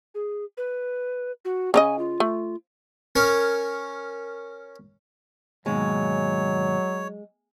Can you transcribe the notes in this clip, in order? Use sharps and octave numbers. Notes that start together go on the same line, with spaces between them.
G#4
B4
F#4
C#3 D#4 D#5 G#5
F4
A3
C#4 A#4 C#5
D#2 G#2 B2 F#3 G#3 C#5